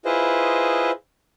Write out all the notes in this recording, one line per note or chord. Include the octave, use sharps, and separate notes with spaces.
E4 F4 G#4 B4 C5 D#5